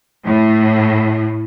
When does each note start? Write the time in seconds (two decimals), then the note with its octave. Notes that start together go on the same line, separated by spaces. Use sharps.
0.24 A2